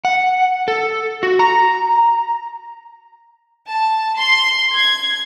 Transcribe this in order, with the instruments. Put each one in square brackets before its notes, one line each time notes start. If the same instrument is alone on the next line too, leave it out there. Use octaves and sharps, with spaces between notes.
[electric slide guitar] F#5
A4
F#4
A#5
[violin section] A5
C6
G#6